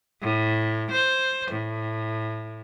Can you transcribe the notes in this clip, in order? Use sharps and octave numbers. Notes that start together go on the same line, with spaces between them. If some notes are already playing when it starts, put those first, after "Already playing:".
A2
C5
A2